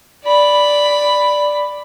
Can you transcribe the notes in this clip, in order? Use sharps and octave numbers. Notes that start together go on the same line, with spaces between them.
D5 B5